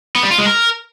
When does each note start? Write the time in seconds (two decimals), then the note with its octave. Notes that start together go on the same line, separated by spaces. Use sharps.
0.15 B3
0.23 G3
0.31 F4
0.38 G#3
0.46 A#4